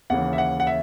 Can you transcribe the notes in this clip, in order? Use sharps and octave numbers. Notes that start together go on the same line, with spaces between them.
D#2 C#3 E3 F#5
E5
F#5
F#5
E5